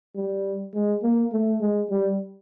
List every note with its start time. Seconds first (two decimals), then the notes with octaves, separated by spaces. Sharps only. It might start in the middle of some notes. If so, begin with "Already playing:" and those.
0.15 G3
0.74 G#3
1.03 A#3
1.33 A3
1.61 G#3
1.90 G3